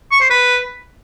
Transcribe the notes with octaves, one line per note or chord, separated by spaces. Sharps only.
C#6
C5
B4